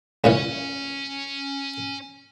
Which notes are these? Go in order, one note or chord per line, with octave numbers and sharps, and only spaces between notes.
C#2 A#2 E3 C#4 G#5